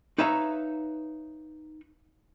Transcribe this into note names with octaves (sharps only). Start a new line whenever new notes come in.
D#4 B4 C#5 E5 F5 A#5